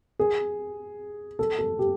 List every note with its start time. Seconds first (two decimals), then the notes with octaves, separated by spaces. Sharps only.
0.19 G#4
1.39 A4
1.59 A4
1.79 G4